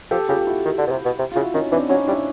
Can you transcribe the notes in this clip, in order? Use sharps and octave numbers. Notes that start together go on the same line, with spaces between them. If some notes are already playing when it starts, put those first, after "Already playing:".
F3 G4 A4
C#3 F4 G4
G4
E4 F#4
D#3
D3
B2
C3
B2
C3
F4
C#3 E4 F#4
D#3 C#4 D#4
E3 C4 D4
F#3 C#4 D#4
G3 D4 E4